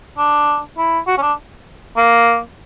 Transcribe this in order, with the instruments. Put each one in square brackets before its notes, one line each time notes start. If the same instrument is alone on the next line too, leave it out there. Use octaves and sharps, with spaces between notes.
[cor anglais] D4
E4
F#4
C#4
D4
A#3